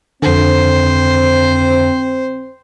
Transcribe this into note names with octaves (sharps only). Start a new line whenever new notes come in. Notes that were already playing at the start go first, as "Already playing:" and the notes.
F2 D3 C4 C5